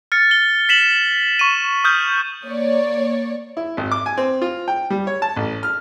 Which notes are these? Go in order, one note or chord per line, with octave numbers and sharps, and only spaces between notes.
F6 A6 C#7
G7
B6 E7 F#7
C#6 D#7
D#6 F6 G6
A#3 C#5 D5
E4
G#1
D6
G#5
C4
F4
G5
G3
C#5
A5
A1
F6